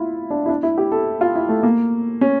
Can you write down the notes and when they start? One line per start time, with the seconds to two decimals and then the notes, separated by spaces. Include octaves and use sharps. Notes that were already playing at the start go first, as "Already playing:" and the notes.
Already playing: E4 F4
0.30 D4
0.46 E4
0.49 D4
0.63 E4
0.78 G4
0.92 A4
1.21 F4
1.36 E4
1.49 A3
1.63 A#3
2.21 C#4